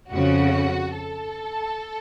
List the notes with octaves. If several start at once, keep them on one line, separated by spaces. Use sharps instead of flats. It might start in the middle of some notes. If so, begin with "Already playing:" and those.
F2 C#3 F3 F#4
A4